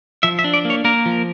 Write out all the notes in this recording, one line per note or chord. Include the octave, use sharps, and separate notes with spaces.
F3 E5
E5
D4
D5
A#3
C#5
A#3 A#4
F3